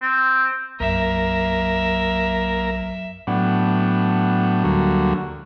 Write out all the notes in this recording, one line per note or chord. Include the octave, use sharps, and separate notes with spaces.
C4
B1 F#2 A#3 A#4 E5
A2 F#3 B3 D4 F#5 G5
D2 D3 F#3 G3 A#3 F#4